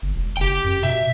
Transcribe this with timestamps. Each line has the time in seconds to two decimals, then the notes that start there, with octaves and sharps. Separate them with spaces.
0.02 G1
0.15 E1
0.37 F#1 G4 G5
0.64 F#2
0.83 B2 E5